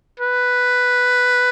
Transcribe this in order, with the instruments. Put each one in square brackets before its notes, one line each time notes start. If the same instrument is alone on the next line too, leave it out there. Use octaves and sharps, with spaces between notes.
[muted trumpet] B4